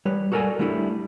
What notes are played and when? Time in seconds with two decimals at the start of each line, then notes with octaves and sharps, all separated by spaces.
0.05 G3 B4 C#5
0.32 F#4 A4 A#4 D5 G#5
0.59 G3 A3 D4 E4 G4 A4